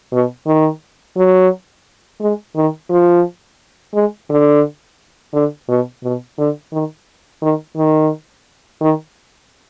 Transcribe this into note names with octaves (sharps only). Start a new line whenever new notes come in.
B2
D#3
F#3
G#3
D#3
F3
G#3
D3
D3
B2
B2
D3
D#3
D#3
D#3
D#3